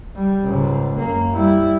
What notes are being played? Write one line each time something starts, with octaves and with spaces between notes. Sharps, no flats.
G3
C#2 G#2
F#2 A#3
G3 E4